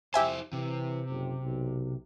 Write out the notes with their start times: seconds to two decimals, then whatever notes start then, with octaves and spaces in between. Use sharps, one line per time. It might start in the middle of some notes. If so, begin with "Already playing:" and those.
0.14 F2 E4 G4 C5 E5 G#5
0.53 C3 E3
1.09 F#1
1.43 B1